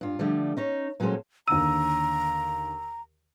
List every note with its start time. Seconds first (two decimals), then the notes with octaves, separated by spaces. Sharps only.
0.01 G2 F4
0.19 D3 F3 G3 A3
0.57 C#4 D#4 C#5
1.00 A#2 F#3 G#3 C#4 A4 C5
1.48 D#2 D3 A#5 E6 D#7